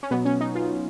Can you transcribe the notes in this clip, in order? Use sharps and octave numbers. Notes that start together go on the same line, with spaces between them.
C#4
B2 F#3 B3
C#4
D#4
F4